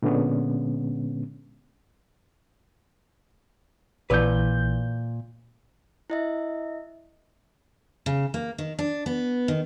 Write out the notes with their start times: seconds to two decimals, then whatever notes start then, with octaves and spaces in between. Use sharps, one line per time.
0.02 A#2 D3 G#3 B3 C#4
4.10 A#1 A#2 E3 B4 G6
6.10 E4 D#5 E5
8.06 C#3
8.34 A#3
8.58 D#3
8.79 D4
9.06 B3
9.48 D#3